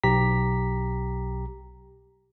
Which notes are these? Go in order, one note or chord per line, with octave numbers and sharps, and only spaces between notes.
B1 G4 A#5 B6